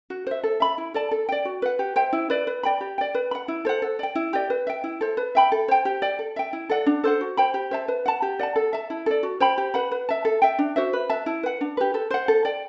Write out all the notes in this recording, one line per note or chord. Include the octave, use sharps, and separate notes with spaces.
F#4
C5 E5
A4
E5 B5
E4
A4 D5 A5
A4
D5 G5
F#4
B4 F#5
G4
C5 E5 G5
E4
B4 D5
B4
D5 G5 B5
G4
D5 G5
B4
F#5 B5
E4
A4 C5 F#5
A4
D5 G5
E4
G4 D5
B4
E5 G5
E4
A4 C5
B4
E5 G5 B5
A4
C5 G5
G4
D5 G5
A4
E5 G5
E4
A4 D5 F#5
D4
A4 C5 F#5
F#4
C5 G5 B5
G4
C5 E5 A5
B4
F#5 A5
G4
D5 F#5 A5
A4
E5 A5
E4
A4 D5
F#4
C5 G5 B5
G4
B4 F#5 B5
B4
E5 A5
A4
E5 G5
D4
F#4 C5 E5
B4
E5 A5
E4
B4 F#5
D4
G4 B4
A4
C5 F#5
A4
D5 G5